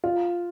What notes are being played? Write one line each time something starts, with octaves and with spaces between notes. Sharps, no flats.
F4